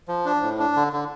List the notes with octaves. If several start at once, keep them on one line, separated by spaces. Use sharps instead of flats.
F3
D4
A2
D4
D3
D3